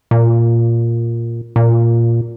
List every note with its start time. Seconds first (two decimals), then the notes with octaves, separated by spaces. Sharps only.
0.11 A#2
1.56 A#2